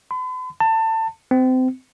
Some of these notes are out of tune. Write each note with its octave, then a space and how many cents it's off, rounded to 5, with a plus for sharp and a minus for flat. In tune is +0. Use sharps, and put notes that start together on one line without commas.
B5 +45
A5 +25
C4 -30